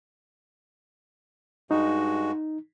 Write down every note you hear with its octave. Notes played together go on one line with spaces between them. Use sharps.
G2 G#3 D#4 F#4